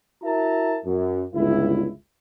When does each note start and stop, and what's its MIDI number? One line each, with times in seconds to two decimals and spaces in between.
0.23 0.78 64
0.23 0.78 66
0.23 0.78 70
0.23 0.78 76
0.23 0.78 81
0.23 0.78 82
0.85 1.24 42
1.34 1.88 31
1.34 1.88 37
1.34 1.88 64